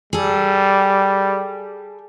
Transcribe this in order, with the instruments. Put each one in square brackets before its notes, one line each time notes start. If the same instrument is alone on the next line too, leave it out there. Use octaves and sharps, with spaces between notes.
[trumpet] G3 [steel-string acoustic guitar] G#4 A4